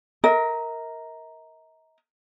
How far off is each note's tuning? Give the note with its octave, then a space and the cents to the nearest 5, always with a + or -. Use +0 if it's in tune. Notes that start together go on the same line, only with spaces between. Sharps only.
A#4 +0 D#5 +45